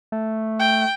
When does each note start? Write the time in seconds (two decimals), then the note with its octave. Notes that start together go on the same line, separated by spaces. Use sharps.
0.12 A3
0.60 G5